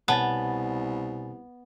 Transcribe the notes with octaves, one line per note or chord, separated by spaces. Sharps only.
C2 B2 B3 C#5 F#5 G#5 A5 A6